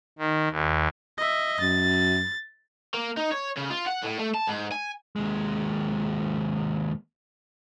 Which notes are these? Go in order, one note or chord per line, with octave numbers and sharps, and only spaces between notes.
D#3
D#2
D#5 E5
F#2 A6
A#3
D#4
C#5
C#3
F4
F#5
A2
A3
A5
G#2
G#5
D#2 G#3